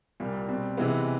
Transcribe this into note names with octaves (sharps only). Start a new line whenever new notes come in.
C2 A#2 G3
B2 G3 C4
C3 E3 G#3 B3